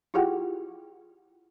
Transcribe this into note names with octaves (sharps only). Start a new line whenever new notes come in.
E4 F4 G4 G#4 F#5 G5